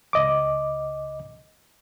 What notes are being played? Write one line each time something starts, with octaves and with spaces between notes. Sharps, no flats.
C#2 D#5 D6